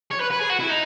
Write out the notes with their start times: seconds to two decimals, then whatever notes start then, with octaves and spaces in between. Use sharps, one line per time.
0.11 C#5
0.20 B4
0.31 B4
0.40 G#4
0.50 F#4
0.60 E4
0.69 D#4